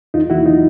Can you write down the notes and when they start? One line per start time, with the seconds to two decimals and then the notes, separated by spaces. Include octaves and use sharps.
0.14 E2 D#4 F4
0.30 E3 E4 F#4
0.46 D#4 F4